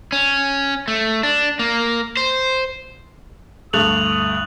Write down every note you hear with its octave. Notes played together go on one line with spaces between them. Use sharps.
C#4
A3
D4
A#3
C5
D2 G2 A3 D#6 F#6 F7 F#7